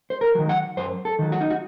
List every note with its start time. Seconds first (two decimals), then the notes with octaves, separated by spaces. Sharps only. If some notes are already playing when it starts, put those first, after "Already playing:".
0.10 C5
0.21 A#4
0.35 D#3 F#3
0.49 F#5
0.77 F#2 C5
1.05 A4
1.19 D#3 F#3
1.32 F#4
1.41 D#4
1.50 F#4